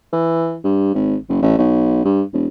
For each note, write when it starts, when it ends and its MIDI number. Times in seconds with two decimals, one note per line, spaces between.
0.13 0.57 52
0.64 0.90 43
0.94 1.15 32
1.29 1.39 30
1.42 1.55 33
1.58 2.04 35
2.05 2.22 43
2.33 2.46 28